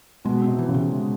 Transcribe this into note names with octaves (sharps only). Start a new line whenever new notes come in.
B2 G#3
C3 C4
E3
C#3
C3
G#3